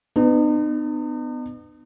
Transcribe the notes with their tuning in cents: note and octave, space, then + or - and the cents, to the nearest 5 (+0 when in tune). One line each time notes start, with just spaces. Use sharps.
B3 +25 D#4 -45